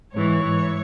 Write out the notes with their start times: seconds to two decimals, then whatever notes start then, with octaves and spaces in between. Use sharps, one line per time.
0.12 G#2 E3 C#5
0.42 G#2 E3